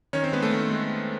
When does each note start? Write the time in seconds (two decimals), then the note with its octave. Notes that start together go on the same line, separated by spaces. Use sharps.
0.13 D#3 C#4 C#5
0.23 C4 C5
0.32 G#3 B3 B4
0.42 A3 A4
0.52 D#3
0.71 G#3